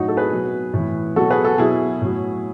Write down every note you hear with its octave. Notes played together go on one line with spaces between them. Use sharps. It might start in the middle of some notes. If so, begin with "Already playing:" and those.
Already playing: A2 F#3 D#4 F#4
A4
G#4 B4
B2 F#3
A2 E3
B2 F#3 F#4 A4
G#4 B4
F#4 A4
B2 F#3 E4 G#4
A2 F#3